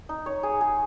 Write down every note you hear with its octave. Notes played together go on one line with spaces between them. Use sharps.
D#4
C#5
G#4
G#4